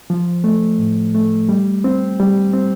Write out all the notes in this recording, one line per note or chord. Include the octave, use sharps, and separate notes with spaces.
F3
A3
A2
A3
G3
C4
G3
C4